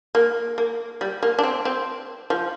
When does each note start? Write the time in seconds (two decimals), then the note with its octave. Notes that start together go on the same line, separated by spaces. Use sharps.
0.15 A#3
0.58 A#3
1.01 G3
1.23 A#3
1.39 D4
1.43 C4
1.65 C4
2.30 F3